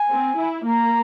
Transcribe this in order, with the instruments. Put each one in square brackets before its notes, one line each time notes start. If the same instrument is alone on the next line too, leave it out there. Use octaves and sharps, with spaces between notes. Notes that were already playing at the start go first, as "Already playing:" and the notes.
Already playing: [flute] G#5
[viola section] C4
E4
[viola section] A#3 [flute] A#5